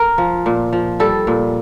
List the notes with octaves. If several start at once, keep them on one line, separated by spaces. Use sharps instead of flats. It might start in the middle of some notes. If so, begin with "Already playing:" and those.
Already playing: A#4
F3
A#2
F3
G3 A4
A#2